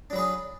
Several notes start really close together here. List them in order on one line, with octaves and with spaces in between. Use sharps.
D4 F#3 B4 G#4